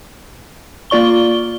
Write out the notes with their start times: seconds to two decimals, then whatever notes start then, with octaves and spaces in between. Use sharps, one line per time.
0.90 A#3 F4 D5 C#6 G7